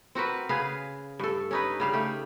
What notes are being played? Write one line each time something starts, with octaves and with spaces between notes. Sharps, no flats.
C4 F#4 A#4 B4
C#3 G#4 B4 F5
G2 A4
C#4 D#4 B4
C#3 G3 F5
A3 G4